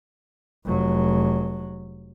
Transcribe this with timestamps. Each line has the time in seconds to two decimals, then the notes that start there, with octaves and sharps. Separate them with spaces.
0.65 F1 F#3